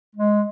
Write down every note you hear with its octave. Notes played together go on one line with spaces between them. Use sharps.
G#3